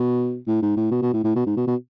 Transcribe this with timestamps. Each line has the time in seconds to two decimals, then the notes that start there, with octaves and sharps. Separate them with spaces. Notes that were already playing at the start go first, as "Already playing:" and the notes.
Already playing: B2
0.47 A2
0.62 G#2
0.77 A2
0.91 B2
1.02 B2
1.13 A2
1.24 A2
1.35 B2
1.46 G#2
1.56 B2
1.67 B2